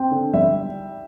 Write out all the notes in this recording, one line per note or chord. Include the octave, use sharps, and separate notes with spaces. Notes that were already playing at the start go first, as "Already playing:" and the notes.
Already playing: C4 G5
D3
G3 E5